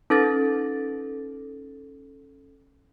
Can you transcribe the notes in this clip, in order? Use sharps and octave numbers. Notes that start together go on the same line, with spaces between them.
C#4 D#4 A4 B4 D6 A6